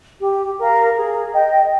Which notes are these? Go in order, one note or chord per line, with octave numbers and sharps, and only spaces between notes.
G4
A#4 F5
G#4
D#5 G5